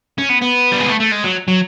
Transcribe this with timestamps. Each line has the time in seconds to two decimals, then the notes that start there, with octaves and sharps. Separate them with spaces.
0.18 C#4
0.29 B3
0.42 B3
0.72 G3
0.80 G#3
0.89 A3
1.00 A3
1.12 G#3
1.24 F#3
1.48 F#3